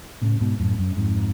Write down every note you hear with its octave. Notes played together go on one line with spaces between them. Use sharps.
A2 C#3
G#2 B2
F#2 A2
F#2
F2 G#2